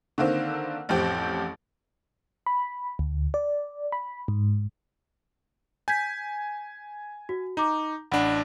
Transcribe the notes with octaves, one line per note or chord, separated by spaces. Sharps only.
D3 D#3 A#3 C4
A1 F2 C4 G4
B5
D2
D5
B5
G#2
G#5 G6 G#6 B6
F#4
D#4 A#5 D6
A1 D4 F#5 B5